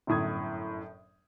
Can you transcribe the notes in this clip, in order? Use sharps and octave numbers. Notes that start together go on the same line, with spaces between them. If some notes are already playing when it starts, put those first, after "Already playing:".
G1 F#2 A2 D#6 G#6